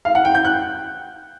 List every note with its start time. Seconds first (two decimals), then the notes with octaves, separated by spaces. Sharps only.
0.05 F5
0.15 F#5
0.25 G5
0.35 G6
0.45 F#6